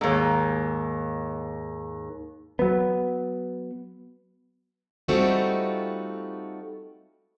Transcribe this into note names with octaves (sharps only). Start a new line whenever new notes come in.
D#2 G#2
F#3 B3
G3 A3 C4 D#4 F4 F#4